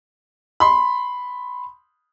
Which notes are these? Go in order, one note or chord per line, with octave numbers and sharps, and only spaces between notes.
B5 C6